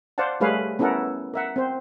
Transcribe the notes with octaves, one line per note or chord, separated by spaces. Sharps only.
C5 D5 F5 F#5 A5
G3 A3 G#4 B4 C#5 F5
B3 C#4 E4 A4 A#4 F#5
A#4 E5 F#5
C4 C5